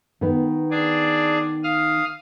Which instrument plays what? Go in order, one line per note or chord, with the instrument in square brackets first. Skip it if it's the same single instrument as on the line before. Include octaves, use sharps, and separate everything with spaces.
[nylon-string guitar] D#3 B3
[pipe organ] D4 G#4 D5
F5 D#6 F6